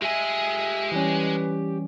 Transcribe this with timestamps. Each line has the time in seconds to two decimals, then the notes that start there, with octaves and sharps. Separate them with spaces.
0.02 G#3 G4 E5 G#5
0.92 E3 G3 C#4 B4